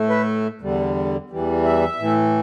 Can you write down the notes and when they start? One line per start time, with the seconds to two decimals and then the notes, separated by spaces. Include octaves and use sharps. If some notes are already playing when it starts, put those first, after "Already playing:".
Already playing: A2 A3
0.10 B4
0.61 E2 D3 G3
1.30 E2 E3 G3
1.64 E5
1.99 A2 E3 A3